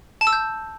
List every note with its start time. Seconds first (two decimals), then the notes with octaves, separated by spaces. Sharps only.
0.21 A5
0.27 E6
0.33 G6